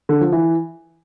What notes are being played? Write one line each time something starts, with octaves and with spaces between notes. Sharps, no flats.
D3
F3
E3